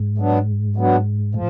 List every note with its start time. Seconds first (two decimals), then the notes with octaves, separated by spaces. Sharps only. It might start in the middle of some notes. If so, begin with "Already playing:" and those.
Already playing: G#2
0.18 F#3 B3 D4
0.76 F#3 B3 D4
1.34 A2 F3